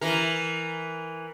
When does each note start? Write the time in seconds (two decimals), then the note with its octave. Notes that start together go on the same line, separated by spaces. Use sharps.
0.01 E3 A#4